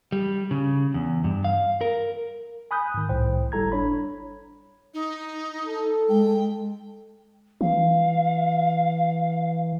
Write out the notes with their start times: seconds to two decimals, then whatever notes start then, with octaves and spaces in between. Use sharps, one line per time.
0.12 G3
0.51 C#3
0.94 E2
1.24 G2
1.44 F5
1.81 A#4
2.71 G#5 B5 D#6 F#6 G6
2.94 G#2 D#3
3.09 C2 A2 C5 G5
3.52 G1 G3 E4 A4 A#5 G#6
3.72 D4 C#5 B5
4.94 D#4
5.65 A4
6.09 G#3 G5
7.61 E3 F5